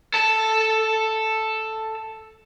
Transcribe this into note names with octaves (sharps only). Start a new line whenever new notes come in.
A4 A5